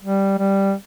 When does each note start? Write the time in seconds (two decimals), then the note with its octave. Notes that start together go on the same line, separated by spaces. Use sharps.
0.01 G3
0.39 G3